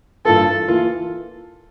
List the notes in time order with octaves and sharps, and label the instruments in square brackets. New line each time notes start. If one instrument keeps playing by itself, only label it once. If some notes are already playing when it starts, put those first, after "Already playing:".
[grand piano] G2 E3 A#3 F4 [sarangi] A4
[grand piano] E3 A#3 F4